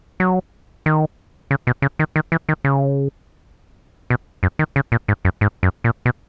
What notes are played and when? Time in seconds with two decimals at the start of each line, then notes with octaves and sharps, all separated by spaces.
0.20 F#3
0.86 D#3
1.51 C#3
1.67 B2
1.82 C#3
1.99 D#3
2.16 D#3
2.32 E3
2.49 D#3
2.65 C#3
4.10 B2
4.43 F#2
4.59 D#3
4.76 C#3
4.92 A#2
5.08 G#2
5.25 F#2
5.41 G#2
5.63 F#2
5.84 A#2
6.06 B2